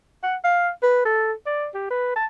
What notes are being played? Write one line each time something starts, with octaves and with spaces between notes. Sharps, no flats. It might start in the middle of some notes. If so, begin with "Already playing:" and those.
F#5
F5
B4
A4
D5
G4
B4
A5